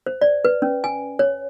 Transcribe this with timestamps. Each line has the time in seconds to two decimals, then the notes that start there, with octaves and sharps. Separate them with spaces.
0.06 C5
0.21 D5
0.45 B4
0.62 C#4
0.84 G#5
1.19 C#5